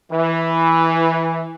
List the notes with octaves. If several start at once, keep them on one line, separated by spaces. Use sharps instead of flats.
E3